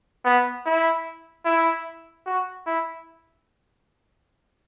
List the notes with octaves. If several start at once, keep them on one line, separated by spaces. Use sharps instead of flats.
B3
E4
E4
F#4
E4